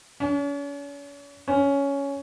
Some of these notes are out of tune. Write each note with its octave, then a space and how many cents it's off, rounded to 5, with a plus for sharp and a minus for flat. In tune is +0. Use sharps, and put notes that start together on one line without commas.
C#4 +40
C#4 +10